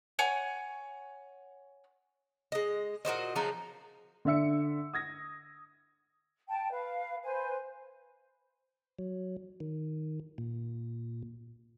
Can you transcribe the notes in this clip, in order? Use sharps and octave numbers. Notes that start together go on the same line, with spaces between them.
C#5 F#5 G#5
G#3 D#5
A#2 F#4 C5 D#5
C#3 F3 F#3 D#4
D3 D4 E5 E6 C#7
D#6 G#6 A#6
G5 A5
B4 F5
B4 C5 G#5
F#3
D#3
A#2